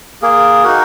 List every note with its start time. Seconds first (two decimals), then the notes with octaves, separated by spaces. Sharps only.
0.22 A#3 G#4
0.64 D#4 F#4 A#4